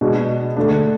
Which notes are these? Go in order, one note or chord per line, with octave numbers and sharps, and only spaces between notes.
B2 G#3 D4
D3 A3 D4